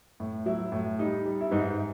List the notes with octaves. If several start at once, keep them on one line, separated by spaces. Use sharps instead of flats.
A2
F#3 E4
A2
G3 D#4
G3
E4
G#2 D#4